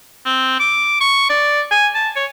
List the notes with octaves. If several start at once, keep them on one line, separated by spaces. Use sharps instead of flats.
C4
D6
C#6
D5
G#5
A5
C#5